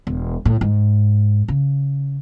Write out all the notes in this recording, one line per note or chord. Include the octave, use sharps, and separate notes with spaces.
E1
A2
G#2
C#3